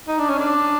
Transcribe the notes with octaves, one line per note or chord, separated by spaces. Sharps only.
D#4
D4
C#4
D4